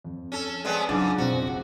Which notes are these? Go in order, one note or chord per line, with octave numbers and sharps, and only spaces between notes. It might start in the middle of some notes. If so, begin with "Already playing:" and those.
F2
C#4 A4
G#3 B3 C4 B4 D5 A5
C#2 G#2 F#3 C#4 D4 D6 A6
F2 B2 C4 F#4
G#3 F#5